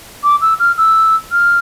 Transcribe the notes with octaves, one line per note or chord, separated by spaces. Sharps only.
D6
E6
F6
E6
F6